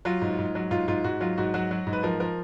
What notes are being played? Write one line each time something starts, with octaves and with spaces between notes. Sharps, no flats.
F#3 F4
G#2
G#2
F#3
G#2 F4
G#2 F4
G#2 F#4
F#3 F4
G#2 F#4
F#3 F#4
F#3
G#2
B4
F3 A#4
F3 A#4